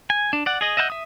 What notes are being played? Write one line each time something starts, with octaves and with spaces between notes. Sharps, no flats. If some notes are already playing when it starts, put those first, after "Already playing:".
G#5
D4
D5 F#5
G#4 D#5
D#5 E5 F#5 A5 G6
E5 D#6